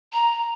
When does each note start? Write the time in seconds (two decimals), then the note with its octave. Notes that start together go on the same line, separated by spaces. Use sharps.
0.13 A#5